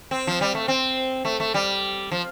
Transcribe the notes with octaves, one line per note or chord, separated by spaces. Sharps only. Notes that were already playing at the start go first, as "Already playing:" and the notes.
C4
F3
G3
A3
C4
A3
A3
G3
F3